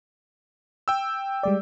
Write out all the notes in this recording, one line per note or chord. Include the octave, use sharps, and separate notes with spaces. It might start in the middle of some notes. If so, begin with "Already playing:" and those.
G5 E6
G3 G#3 D5